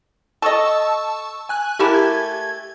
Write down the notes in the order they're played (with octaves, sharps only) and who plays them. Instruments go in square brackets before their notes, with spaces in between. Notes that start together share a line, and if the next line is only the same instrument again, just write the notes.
[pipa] A4 D#5 [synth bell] A5 C#6 E6
[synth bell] G#5 F#6
[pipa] A3 A#3 E4 [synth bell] G4
[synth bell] G#6